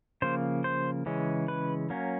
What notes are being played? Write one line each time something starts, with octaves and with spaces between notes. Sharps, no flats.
C#3 F3 A#3 C5
C5
C#3 E3 G#3 C#4
B4
F#3 A#3 C#4